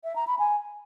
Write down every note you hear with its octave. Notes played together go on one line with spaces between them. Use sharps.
E5
A#5
B5
G#5